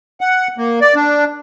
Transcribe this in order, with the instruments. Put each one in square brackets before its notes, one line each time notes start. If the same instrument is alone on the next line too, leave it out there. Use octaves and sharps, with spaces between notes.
[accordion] F#5
A#3
D5
D4